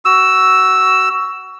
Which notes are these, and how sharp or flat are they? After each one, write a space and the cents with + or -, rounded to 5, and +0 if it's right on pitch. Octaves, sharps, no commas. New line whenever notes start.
F#4 +15 E6 +0